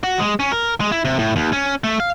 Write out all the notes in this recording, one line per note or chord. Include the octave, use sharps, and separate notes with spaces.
F#4
G#3
C#4
A#4
G#3
E4
C3
A2
D#2
C#4
A3
F5